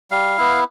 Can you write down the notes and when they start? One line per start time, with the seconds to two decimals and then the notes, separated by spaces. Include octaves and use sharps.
0.11 G3 F5
0.38 B3 E4